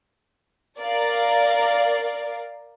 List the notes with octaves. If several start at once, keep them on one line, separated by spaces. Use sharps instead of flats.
A#4 D5 F5